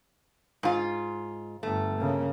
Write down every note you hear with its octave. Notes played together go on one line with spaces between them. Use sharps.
G#2 F4
G1 A3
C#3 A#3